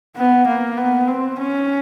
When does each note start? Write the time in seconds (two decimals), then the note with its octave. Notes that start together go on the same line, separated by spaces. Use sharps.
0.16 B3
0.47 A#3
0.78 B3
1.07 C4
1.39 C#4